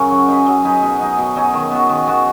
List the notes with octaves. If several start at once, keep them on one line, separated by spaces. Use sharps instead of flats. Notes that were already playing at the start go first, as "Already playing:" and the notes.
Already playing: F#2 C#3 C#4
F#3
D#4 G#4 B4
F#3
D#4 G#4 B4
B2
F#3 D#4 G#4
B2
F#3 D#4 G#4
D#3
B3 F#4
D#3
B3 F#4